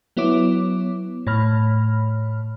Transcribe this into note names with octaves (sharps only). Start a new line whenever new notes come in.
F#3 B3 E4 C#5 D6
A2 C#5 B5 F6